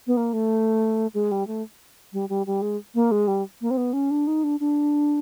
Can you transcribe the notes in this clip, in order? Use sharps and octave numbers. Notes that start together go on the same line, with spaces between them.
B3
A#3
A3
G#3
G3
A3
G3
G3
G3
G#3
A#3
G#3
G3
A#3
C4
B3
C#4
D4
D#4
D4
D4